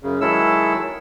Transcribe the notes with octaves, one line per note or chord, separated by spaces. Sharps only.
F#2 C#3
D#3 F#3 G#3 E4 A4 E6